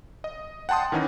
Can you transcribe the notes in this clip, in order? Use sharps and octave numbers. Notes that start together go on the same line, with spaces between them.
D#5
F#5 G5 A5 C6 D#6
D#3 E3 C#4 D#4